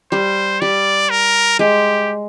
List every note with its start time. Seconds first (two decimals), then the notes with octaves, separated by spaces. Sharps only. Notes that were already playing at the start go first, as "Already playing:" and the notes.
0.12 G3 C5
0.61 G3 D5
1.10 A#4
1.59 G#3 G4